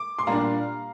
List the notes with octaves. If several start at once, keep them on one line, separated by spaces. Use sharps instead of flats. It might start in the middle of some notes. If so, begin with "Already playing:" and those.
Already playing: D6
C6
A#2 G3 D4 F5 A#5